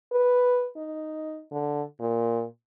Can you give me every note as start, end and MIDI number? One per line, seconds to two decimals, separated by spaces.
0.12 0.69 71
0.77 1.42 63
1.51 1.82 50
2.00 2.44 46